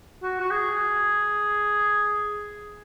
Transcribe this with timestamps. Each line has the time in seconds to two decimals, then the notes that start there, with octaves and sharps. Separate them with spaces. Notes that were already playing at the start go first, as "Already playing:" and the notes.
0.22 F#4
0.40 F#4
0.51 G#4